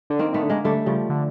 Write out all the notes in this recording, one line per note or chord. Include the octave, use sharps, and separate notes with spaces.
D3
D#3 A#3 C4
D#3 A3 B3
D3
G#3 A#3
D3 G3 A3
C#3 F3 G3
D3